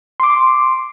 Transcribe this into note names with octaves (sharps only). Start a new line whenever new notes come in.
C6 D6